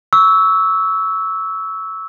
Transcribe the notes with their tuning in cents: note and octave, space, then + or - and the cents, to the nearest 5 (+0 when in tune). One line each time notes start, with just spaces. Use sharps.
C#6 +25 E6 -10